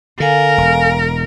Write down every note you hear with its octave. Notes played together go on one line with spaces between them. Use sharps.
D3 A4 A#4 F5 G#5
E1